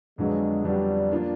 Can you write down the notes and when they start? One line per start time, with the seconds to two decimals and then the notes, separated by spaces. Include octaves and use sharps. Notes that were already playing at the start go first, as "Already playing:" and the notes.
0.18 F2 D3 F#3 G#3 B3 D4
0.64 F2 D3 F#3 G3 B3 D4
1.11 F3 A#3 D4 F4